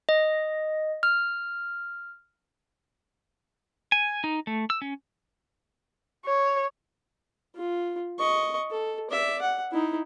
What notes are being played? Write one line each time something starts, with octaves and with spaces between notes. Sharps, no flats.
D#5
F6
G#5
D#4
A3
E6
C#4
C#5
F4
D#5 C#6
A4
D5 E5
F#5
D#4 E4